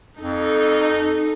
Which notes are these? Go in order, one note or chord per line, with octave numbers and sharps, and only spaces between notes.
F2 D#4 A4